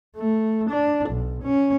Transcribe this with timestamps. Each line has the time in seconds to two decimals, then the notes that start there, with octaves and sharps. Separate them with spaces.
0.16 A3
0.70 D4
1.09 B1
1.43 C#4